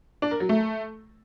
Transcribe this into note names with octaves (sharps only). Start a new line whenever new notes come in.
D4
A#4
F#3
A3